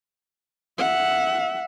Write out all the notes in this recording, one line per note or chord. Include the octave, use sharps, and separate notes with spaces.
E5 F#5